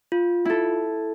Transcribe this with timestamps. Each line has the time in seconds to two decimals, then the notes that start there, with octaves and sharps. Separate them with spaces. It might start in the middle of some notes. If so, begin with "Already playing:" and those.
0.12 F4
0.45 E4 A4